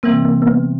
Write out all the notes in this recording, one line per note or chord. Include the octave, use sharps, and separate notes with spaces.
C3 E3 G3 A#3 C4
A#3
A#3
B3